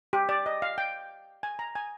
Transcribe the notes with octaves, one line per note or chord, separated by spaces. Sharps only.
G4
D5
D#5
F5
G5
G#5
A#5
G#5